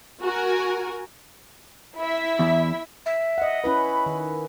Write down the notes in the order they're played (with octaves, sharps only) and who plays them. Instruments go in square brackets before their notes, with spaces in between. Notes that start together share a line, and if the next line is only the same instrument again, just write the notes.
[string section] F#4 A#4 G#5
E4 E5
[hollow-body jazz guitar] E2
[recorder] E5
[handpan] D#5 F#5
[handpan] C#4 E4 B4 [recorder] B5
[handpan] D#3